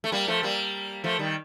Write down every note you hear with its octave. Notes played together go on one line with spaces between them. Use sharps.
A3
G3 A#3
F3 A3
G3 A#3
F3 A3
D#3 G3